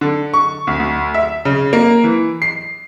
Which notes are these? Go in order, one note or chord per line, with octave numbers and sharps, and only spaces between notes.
D3
C#6
D2
D2
E5
C#3
A#3
E3
C7